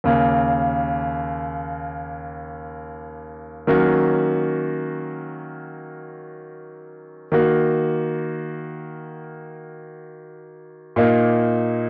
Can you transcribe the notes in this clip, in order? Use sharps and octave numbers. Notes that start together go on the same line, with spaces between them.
D#2 C#3 A#3
D#3 F#3 A#3 C#4 F#4
D#3 A#3 F#4
A#2 A#3 D#4